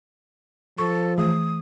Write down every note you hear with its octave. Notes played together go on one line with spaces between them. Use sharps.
F3 A4 C#6
E3 A3 G#4 D#6